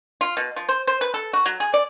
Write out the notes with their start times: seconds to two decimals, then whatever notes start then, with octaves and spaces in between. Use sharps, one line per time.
0.21 F4
0.37 B2
0.56 F3
0.69 C5
0.87 C5
1.01 B4
1.14 A4
1.33 F#4
1.46 F#3
1.60 G#4
1.74 D5